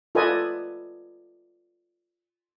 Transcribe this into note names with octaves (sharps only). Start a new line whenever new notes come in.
F4 A4 B4 D5 D#5 G#5